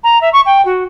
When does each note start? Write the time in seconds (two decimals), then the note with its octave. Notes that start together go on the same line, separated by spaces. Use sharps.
0.04 A#5
0.21 E5
0.33 C#6
0.46 G5
0.65 F#4